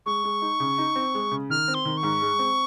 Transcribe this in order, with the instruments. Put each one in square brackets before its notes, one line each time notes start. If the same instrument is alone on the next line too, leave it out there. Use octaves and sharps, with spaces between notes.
[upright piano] G#3 [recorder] C#6
[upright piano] G#3
D#4
C#3
D#4
C4
G#3
C#3
[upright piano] D#3 [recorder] F6
[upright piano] C4
[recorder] C6
[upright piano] D#3
[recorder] C#6
[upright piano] G#2
G#3
C4